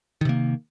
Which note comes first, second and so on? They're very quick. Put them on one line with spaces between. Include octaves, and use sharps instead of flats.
D#3 C3 A#3